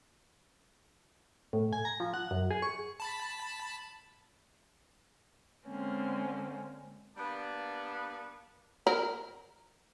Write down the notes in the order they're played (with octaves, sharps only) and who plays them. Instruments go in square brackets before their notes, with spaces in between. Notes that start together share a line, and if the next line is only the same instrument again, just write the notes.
[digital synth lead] A2
G#5
A#5
F3
F#5
F#2
G#4
C#6
[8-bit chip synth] A5 B5
[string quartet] D3 G#3 A#3 C4 C#4
[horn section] G3 A#3 B3 D4
[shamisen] A#4